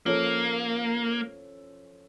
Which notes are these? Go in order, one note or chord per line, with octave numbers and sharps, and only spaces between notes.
F3 A#3 C#4 F4 A4 C#5